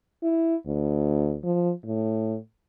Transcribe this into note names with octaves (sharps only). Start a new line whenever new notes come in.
E4
D2
F3
A2